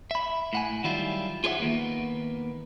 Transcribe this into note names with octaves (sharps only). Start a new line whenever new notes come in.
E5 B5
A2 F#5 G#5
D#3 F#3 G3 E4 F4
F4 G#4 B4 D5 E5 F#5
D#3 A#3 B3